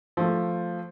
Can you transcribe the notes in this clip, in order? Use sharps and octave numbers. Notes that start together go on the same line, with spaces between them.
F3 A3